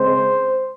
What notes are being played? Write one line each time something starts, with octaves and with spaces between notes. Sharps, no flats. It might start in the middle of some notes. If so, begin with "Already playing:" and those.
Already playing: C#3 G#3 C4 C5